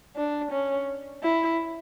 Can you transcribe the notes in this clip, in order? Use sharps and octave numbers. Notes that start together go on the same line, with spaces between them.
D4
C#4
E4